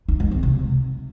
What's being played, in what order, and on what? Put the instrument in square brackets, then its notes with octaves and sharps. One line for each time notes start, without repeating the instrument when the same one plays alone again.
[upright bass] D#4
G#3
C4
C3